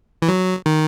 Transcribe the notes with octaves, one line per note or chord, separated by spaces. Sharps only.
E3
F#3
D#3